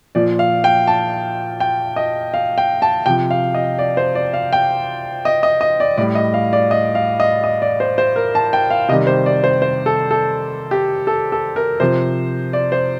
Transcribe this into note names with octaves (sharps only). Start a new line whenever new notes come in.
A#2 F3 D5
F5
G5
A5
G5
D#5
F5
G5
A5
C3 F3 G5
F5
D#5
D5
C5
D5
F5
G5
D#5
D#5
D#5
D5
A2 G3 D5
D#5
F5
D5
D#5
F5
D#5
D#5
D5
C5
C5
A#4
A5
G5
F5
C3 D#3 G3 D#5
C5
D5
C5
C5
A4
A4
G4
A4
A4
A#4
C3 F3 C5
D5
C5